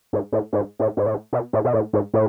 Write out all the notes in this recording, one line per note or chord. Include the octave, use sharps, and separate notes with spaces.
G#2
A2
G#2
A2
G#2
A2
B2
A2
B2
A2
G#2
A2